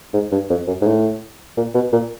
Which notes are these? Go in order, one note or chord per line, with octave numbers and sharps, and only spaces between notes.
G#2
G2
F2
F#2
G#2
A2
A#2
B2
A#2